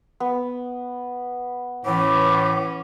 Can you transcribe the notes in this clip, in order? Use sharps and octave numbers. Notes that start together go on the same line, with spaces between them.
B3
A2 E3 C#4 D6